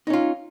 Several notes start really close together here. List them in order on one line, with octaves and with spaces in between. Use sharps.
D#4 C#4 F4